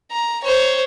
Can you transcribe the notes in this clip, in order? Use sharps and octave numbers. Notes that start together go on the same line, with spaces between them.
A#5
C5 C#5